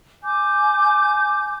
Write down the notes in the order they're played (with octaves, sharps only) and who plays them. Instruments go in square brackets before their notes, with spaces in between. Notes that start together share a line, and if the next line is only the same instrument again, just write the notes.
[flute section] G#5 D6 G6